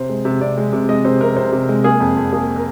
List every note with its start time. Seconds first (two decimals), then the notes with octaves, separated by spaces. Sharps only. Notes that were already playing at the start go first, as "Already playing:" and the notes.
Already playing: C3 C5
0.09 G#3
0.25 C3
0.41 C3 D5
0.58 G#3
0.73 C3
0.89 G#3 D#5
1.05 C3 C5
1.21 C3 A#4
1.36 C3 C5
1.52 C3
1.69 G#3
1.84 A#3 G#4
2.00 F2
2.16 F2
2.32 A#3 G#4
2.56 A#4